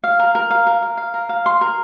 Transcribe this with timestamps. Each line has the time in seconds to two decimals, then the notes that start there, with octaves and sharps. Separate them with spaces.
0.04 F5
0.19 A#4
0.35 A#4
0.51 F5
0.67 A#4
0.82 F5
0.97 F5
1.14 A#4
1.29 F5
1.46 C6
1.61 A#4